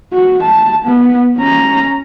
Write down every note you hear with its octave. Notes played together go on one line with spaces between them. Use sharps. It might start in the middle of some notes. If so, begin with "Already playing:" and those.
F#4
A5
B3
C#4 A#5